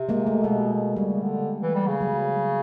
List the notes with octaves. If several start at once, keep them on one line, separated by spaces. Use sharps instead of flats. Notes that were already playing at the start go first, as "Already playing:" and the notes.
Already playing: C3
G#3 A#3
A3
B2 G#3
C#3 G3
D3
E3
G3
C#3
F#3